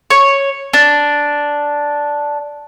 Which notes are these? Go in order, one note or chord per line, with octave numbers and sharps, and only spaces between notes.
C#5
D4